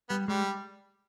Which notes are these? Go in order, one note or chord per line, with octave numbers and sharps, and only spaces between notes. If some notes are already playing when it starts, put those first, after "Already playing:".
G3 B3
G3 G#3